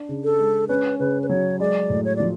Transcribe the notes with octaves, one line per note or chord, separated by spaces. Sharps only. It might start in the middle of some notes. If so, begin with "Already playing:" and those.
Already playing: D4
C#3
A4
G#3
C#4 B4
C#3 B4
B4
F#3 C#5
G#3 D5
A2
C#5
F3 D5